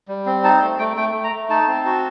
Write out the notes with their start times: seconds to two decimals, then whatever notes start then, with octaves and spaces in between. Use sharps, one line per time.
0.08 G3
0.26 C4
0.44 D#4 A5
0.62 A3
0.79 A3 G5
0.97 A3 G5
1.14 A3
1.24 A#5
1.32 A3
1.50 D#4 A5
1.67 C4
1.85 F#4